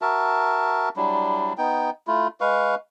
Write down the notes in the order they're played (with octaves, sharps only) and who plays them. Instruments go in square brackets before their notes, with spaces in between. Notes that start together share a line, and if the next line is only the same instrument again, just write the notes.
[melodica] F#4 A#4 E5 A5
F#3 G3 D4 E4
B3 D#4 G5
A3 E4 F4
G#3 B4 F5 C#6